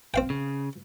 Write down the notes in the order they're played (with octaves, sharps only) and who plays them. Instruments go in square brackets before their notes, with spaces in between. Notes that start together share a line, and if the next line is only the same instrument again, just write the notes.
[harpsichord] C4 F5 G5
[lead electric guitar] C#3